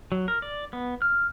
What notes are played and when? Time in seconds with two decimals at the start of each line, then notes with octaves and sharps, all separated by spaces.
0.12 F#3
0.28 A#4
0.42 D5
0.73 B3
1.02 F6